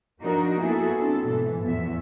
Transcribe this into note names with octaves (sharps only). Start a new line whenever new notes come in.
F3 D4 D#4 F#4 A#4
A#3 B3 E4 F#4 G#4 A4
C4 D4 A4
G#2 B2 E3
E2 A2 F3 B3 E5